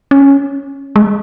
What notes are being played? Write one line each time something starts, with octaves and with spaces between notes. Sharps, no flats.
C#4
G#3